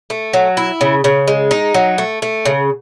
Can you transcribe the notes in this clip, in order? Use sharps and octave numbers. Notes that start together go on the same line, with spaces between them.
A3
F#3
E4
C#3
C#3
G#3
D#4
F#3
A3
A3
C#3